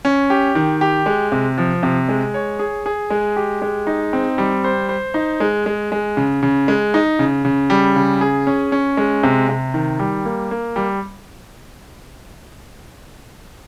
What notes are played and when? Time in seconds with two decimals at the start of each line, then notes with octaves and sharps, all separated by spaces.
0.05 C#4
0.30 G4
0.55 D#3
0.81 G4
1.06 G#3
1.32 C3
1.58 F3
1.83 C3
2.09 G#3
2.34 C#5
2.59 G#4
2.86 G#4
3.10 G#3
3.36 G4
3.62 G#3
3.87 D#4
4.13 C4
4.38 G3
4.64 C5
4.89 C5
5.14 D#4
5.40 G#3
5.66 G#3
5.92 G#3
6.17 C#3
6.43 C#3
6.68 G#3
6.94 D#4
7.19 C#3
7.45 C#3
7.70 G3
7.96 C#3
8.21 G#4
8.47 C#4
8.72 C#4
8.97 G#3
9.23 C3
9.49 C3
9.74 D#3
9.99 G3
10.25 A#3
10.51 A#3
10.76 G3